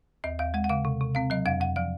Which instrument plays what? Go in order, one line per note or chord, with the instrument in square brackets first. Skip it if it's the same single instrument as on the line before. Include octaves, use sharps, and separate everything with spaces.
[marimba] D#2 D#5
D#2 F5
G#3 F#5
F#5
C#3 F5
C3
C3
C4 F5
F#3 D#5
F2 F5
F2 F#5
F3 F5